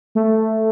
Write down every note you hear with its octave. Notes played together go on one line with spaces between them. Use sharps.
A3